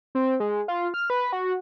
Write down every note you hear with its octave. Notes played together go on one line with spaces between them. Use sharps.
C4
G#3
F4
F6
B4
F#4